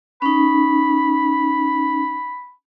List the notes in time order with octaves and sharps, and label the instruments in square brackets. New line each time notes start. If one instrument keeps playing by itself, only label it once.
[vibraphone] C#4 D#4 [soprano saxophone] B5